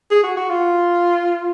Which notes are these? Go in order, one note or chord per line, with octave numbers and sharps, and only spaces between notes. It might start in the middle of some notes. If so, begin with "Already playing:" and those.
G#4
F#4
F#4
F4